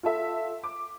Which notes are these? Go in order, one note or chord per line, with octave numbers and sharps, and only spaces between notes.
F4 A4 E5
D6